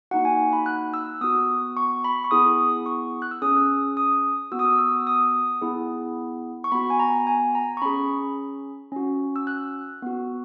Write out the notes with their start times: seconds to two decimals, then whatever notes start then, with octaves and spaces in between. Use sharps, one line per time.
0.11 A#3 D#4 F#4 F#5
0.25 G#5
0.53 B5
0.66 F#6
0.94 E6
1.21 B3 F#4 D#6
1.77 C#6
2.04 B5
2.24 C#6
2.31 B3 E4 G#4 D#6
2.86 C#6
3.22 F#6
3.31 E6
3.42 C#4 G#4 D#6
3.97 D#6
4.51 B3 F#4 E6
4.59 D#6
4.65 E6
4.79 E6
5.07 D#6
5.62 B3 E4 G#4
6.64 C#6
6.72 B3 F#4 B5
6.90 G#5
7.00 A#5
7.27 G#5
7.55 A#5
7.77 C#6
7.82 C#4 G#4 B5
8.92 C#4 F#4
9.36 E6
9.47 F#6
10.02 B3 F#4